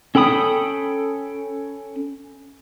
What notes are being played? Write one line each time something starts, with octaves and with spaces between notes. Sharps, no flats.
C#4 A4 G5 B5 D#6